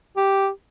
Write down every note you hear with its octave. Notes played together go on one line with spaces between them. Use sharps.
G4